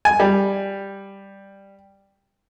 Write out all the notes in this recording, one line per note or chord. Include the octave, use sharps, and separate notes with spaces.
G#5
G3